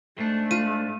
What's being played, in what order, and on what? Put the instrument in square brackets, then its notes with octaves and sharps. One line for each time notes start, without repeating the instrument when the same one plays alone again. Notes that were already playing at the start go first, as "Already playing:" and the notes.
[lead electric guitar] G#2 D4 [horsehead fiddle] A3
[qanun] F4 [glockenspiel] D#7